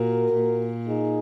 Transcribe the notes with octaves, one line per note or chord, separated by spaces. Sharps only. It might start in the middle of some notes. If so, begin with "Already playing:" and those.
Already playing: A#2 F#4 A#4
A#2
D#4 G#4